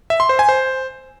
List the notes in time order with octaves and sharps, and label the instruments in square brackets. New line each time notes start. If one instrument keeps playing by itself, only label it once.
[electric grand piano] E5
C6
C5
G#5
C5